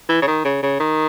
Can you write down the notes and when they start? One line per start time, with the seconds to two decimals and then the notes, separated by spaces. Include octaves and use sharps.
0.09 E3
0.22 C#3
0.27 D#3
0.45 C#3
0.62 C#3
0.80 D#3